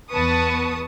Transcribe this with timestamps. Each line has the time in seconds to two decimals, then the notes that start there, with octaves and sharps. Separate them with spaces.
0.13 E2 B3 B4 A5 C#6 D#6